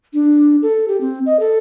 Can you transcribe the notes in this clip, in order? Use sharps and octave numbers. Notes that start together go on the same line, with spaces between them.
D4
A4
G4
C4
D#5
A4